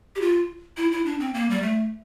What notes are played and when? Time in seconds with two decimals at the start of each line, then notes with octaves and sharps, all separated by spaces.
0.16 G4
0.21 F4
0.77 E4
0.92 E4
1.06 D4
1.20 C4
1.34 A#3
1.50 G3
1.62 A3